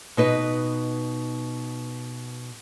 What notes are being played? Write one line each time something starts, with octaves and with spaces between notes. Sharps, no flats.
B2 D#4 B4